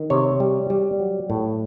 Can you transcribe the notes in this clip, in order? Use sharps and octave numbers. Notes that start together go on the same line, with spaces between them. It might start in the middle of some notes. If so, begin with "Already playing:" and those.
Already playing: D#3
C3 C#5
G3
G3
F#3
A2